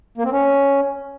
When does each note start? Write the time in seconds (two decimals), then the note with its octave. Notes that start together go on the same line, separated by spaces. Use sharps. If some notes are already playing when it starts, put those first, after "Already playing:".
0.18 A#3
0.25 C4
0.32 C#4